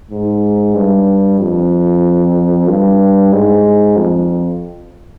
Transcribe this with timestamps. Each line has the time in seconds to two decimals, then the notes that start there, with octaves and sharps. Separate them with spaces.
0.11 G#2
0.75 G2
1.40 F2
2.68 G2
3.33 G#2
3.97 F2